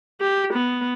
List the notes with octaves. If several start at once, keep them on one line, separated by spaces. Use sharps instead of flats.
G4
B3